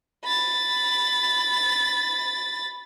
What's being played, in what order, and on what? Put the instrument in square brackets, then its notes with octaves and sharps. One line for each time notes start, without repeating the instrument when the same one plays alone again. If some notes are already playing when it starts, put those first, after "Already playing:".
[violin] B5 A6